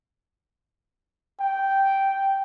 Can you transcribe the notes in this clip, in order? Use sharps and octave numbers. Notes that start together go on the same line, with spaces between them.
G5